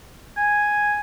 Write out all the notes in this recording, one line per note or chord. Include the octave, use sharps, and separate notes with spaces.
G#5